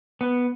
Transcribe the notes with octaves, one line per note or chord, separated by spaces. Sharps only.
B3